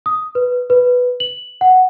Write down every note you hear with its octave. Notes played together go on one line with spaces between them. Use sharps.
D#6
B4
B4
F#7
F#5